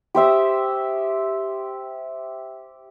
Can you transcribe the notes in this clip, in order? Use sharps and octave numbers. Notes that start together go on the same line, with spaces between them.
G4 C5 E5 D#6